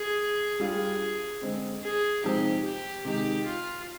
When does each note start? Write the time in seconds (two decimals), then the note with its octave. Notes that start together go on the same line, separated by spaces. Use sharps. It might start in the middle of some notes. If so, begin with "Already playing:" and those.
Already playing: G#4
0.60 G3 D4 F4 G#4
1.41 D3 G#3 C4
1.83 G#4
2.24 C3 F3 G#3 C4 D#4 G4
2.65 G4
3.05 C3 D#3 G#3 G4
3.46 F4